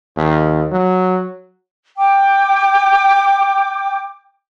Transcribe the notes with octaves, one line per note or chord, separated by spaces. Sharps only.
D#2
F#3
G5 D6